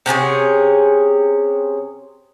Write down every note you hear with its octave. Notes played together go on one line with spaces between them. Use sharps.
C3 C#4 D4 G#4